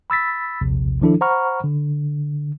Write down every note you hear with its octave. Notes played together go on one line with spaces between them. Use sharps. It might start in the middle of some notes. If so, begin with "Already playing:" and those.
B5 E6 A6 B6
A#1 D#2 C3
D#3 F3 D4 E4 A4
C5 F#5 A#5 B5 C#6 F6
D3